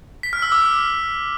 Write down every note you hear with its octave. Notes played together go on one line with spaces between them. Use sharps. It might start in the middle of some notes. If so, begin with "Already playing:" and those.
B6
F6
E6
D6
F6